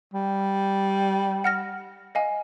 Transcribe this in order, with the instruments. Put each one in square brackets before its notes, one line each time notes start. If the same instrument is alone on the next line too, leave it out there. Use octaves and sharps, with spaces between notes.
[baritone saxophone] G3
[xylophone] F#5 F6 A#6
D#5 F5 G#5